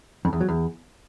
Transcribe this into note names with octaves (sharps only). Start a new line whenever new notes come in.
F2
E2
F#3
E2